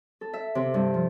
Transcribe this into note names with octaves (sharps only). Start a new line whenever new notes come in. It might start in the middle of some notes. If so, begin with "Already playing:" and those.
A4
E5
C3
G2
F3